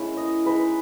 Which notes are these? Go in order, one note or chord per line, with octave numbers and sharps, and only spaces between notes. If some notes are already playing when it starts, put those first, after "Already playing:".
Already playing: G#3 A#3 C#4 E4
D#5
G#3 D#4 B4